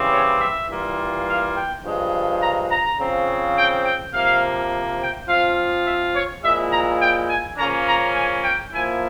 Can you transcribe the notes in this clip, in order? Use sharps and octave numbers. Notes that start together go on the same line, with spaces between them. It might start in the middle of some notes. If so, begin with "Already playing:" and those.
Already playing: C#3 E3 G3 C4
C#5
E5
E3 G3 A#3 F4
F5
G5
G2 F3 G#3
A#5
A#5
C#3 F3 C4
G5
G5
C3 F3 A#3 F5
G5
F3 C4 F4 F5
E5
C#5
A#2 F3 G#3 E4 E5
A#5
G5
G#5
C#3 F3 A#3 C#4 A#5
A#5
G#5
G5
F3 A#3 E4 G#5